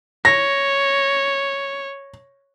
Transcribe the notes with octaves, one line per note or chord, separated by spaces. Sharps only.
C#5 A#6